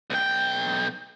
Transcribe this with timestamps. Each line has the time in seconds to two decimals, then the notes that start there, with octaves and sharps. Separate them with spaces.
0.10 B1 G5